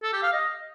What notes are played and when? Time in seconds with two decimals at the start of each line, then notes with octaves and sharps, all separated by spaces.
0.03 A4
0.13 G4
0.23 F5
0.33 D#5